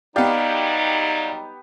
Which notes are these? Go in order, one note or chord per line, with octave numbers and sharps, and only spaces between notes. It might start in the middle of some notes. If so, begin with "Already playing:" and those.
F#3 G3 B3 D#4 G4 D5 F5